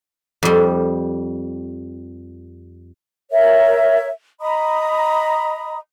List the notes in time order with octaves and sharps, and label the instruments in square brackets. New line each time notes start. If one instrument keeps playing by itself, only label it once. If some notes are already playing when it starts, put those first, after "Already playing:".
[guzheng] F2 G3
[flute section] A#4 C#5 E5
D#5 A#5 B5 D#6